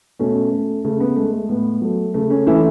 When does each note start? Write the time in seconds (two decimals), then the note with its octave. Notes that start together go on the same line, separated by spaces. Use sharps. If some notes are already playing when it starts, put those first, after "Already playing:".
0.19 B2 A3 C#4
0.52 A3
0.85 C#3 A3
1.00 B3
1.16 G#3 A3
1.33 A3
1.49 A2 B3
1.82 F#3 A3
2.14 C#3 A3
2.30 A3 C#4
2.47 E3 A3 C#4 E4